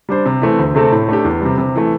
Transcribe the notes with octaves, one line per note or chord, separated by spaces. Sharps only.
G3 D4 C5
C3
E3 A3 C4
D2
C3 A3 C4 A4
A2
A3 D4 G4
E2
C3 G3
C3
E3 A3